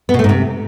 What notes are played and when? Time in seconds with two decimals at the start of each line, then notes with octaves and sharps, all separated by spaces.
0.09 B3
0.14 B2
0.19 A3
0.24 G#2
0.29 C3